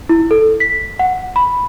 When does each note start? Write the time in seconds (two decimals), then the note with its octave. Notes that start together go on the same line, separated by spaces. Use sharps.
0.09 E4
0.31 A4
0.60 B6
0.99 F#5
1.36 B5